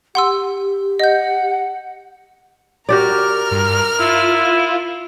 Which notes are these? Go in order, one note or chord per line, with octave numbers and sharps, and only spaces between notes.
G4 F#5 C6 E6
D#5 F#5 G6
F#4 G4 A#4 D5 F6
G2
E4 F4